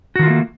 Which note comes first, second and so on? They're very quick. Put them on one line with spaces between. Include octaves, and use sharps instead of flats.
F#4 D#3 F4 A3 A#3